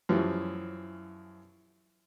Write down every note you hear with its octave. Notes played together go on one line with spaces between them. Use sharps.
F#2 E3 F3 G3 C#4